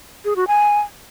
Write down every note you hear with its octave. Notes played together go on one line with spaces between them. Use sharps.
G#4
F#4
G#5